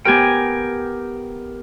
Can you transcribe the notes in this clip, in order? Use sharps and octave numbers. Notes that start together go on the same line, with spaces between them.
B3 G4 A#4 G5 G#5